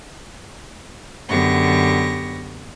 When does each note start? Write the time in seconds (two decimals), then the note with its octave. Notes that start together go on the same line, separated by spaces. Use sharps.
1.29 F#2 D3 B3 G4 C#6 A#6